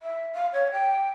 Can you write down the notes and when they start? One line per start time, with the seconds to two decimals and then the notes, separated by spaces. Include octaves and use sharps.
0.02 E5
0.35 F5
0.53 C#5
0.72 G5